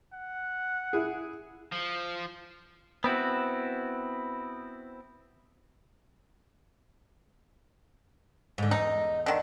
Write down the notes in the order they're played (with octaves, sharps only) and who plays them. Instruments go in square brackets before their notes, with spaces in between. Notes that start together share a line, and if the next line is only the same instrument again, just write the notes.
[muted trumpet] F#5
[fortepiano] E4 G#4
[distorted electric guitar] F3
[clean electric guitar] B3 C4 E4 F#4
[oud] G#2 D3
[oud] E2 [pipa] D#4
[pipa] D3 D#3